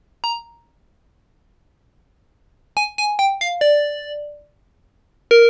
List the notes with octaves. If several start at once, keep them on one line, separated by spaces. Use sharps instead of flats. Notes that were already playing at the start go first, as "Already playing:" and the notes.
A#5
G#5
G#5
G5
F5
D5
A#4